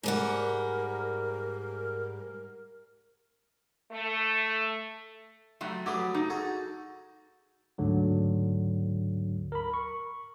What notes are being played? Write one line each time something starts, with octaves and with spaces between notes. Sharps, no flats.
G#2 G3 A#4 F#5
A3
F#3 G3 A3
F#3 A3 G4 G#4 B4
D#4
F#4 G#4 A4
D2 G#2 D3 F#3
A#4 B5
C#6